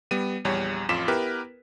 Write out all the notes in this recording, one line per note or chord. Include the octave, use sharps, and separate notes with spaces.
G3 B3 D#7
A#1 E2 G3 C#5
A1 F2 F4 D6 B6 E7
B3 E4 G4 A#4 B4